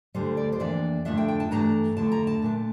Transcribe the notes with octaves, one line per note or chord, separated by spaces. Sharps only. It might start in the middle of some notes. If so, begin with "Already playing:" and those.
D2 D3 G3 C5
D5
C5
F2 E3 A#3 D4 D5
F2 D3 A3 D4 E5
G5
G5
A5
G2 E3 A3 D4 A#5
F2 D3 A3 A5
A#5
A5
A#2 A3 D4